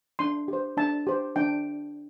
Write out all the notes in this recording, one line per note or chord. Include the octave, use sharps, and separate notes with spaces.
D4 C6
G4 C5
D4 A5
G4 C5
D4 G5